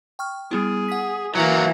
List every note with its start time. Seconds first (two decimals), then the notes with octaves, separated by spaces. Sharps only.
0.19 G5 C#6 F6
0.51 G3 B3 E4 G#4
0.88 F#5 B6
1.35 E3 F#3 A#3 A#5